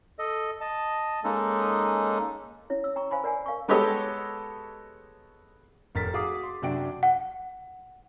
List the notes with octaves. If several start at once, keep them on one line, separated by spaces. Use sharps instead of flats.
A4 D#5
D#5 A5
G#3 A#3 C#4 D#4 A4
C#4 E4 C#5
E6
G5 A#5 C#6
C5 F5 G#5 B5 C6
A#4 D5 F#5 G#5
A#4 F5 G#5 C#6
G#3 B3 G4 A4 C#5 D#5
F1 A#4 A6 B6
F#4 G#4 F5 D6 D#6
C6
F#2 C3 D4 F#4 G5 D7
F#5